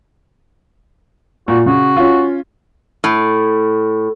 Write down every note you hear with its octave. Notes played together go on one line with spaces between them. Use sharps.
A#2 F#4
C#3 F#4
C#4 F4
A2